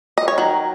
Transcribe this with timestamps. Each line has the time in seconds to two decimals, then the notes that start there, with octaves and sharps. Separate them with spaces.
0.18 D#5
0.28 C#5
0.38 D#3 F#3